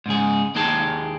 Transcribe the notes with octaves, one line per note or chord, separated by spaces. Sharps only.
G#2 C#3 G#4
D#2 A#3 D#4 G4 G#4 A5